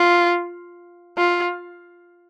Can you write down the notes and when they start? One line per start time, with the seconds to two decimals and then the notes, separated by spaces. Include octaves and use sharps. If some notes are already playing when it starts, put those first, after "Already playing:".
Already playing: F4
1.17 F4